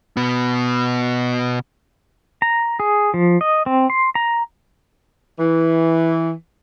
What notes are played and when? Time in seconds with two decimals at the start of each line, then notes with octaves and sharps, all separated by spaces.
0.17 B2 B3
2.42 A#5
2.80 G#4
3.14 F3
3.41 D#5
3.66 C4
3.90 C6
4.15 A#5
5.39 E3